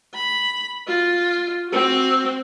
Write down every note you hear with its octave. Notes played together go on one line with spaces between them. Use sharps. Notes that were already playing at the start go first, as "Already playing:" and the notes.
B5
F4
C4 F#4